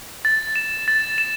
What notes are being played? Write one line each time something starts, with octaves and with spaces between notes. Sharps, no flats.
A6
E7
A6
E7